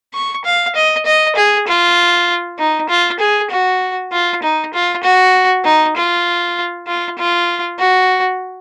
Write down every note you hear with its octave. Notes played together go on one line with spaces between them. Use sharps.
C#6
F5
D#5
D#5
G#4
F4
D#4
F4
G#4
F#4
F4
D#4
F4
F#4
D#4
F4
F4
F4
F#4